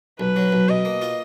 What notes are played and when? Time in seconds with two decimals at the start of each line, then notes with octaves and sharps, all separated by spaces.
0.20 B1 B4
0.36 F#3
0.52 B1
0.68 B2 D#5
0.85 A#3
1.02 F4